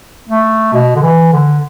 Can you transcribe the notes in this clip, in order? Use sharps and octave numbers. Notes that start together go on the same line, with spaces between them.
A3
B2
D3
E3
D3